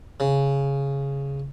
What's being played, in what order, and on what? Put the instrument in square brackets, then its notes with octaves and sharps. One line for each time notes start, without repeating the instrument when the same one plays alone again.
[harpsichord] C#3